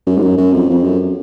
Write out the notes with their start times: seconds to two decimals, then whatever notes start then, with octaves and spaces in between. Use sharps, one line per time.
0.07 F#2
0.17 G#2
0.22 F#2
0.38 F#2
0.54 F2
0.70 F2
0.84 F#2